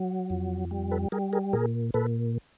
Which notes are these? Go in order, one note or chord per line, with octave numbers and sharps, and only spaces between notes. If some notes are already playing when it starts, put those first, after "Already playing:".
Already playing: F#3
F2
G3
A4 B4
G3 G#4 A#4
G#4 A#4
A#2 G#4 A#4
A#2 A4 B4